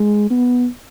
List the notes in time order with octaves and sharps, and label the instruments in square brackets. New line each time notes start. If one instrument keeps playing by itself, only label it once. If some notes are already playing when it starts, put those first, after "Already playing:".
Already playing: [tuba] G#3
B3